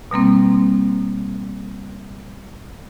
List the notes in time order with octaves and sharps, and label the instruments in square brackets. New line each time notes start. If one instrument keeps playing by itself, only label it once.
[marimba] B2 G3 A#3 C4